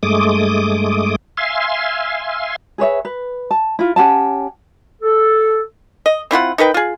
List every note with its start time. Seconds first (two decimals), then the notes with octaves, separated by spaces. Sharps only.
0.03 G2 G#3 A3 D6 D#6
1.37 E5 F5 G#5 C6
2.78 G#4 B4 C#5 E5
3.05 B4
3.51 A5
3.79 E4 F4
3.96 C#4 G4 F#5 A5
5.02 A4
6.06 D#5
6.31 C4 E4 F4 F#5
6.58 D#4 A#4 B4 G5
6.74 F4 G#4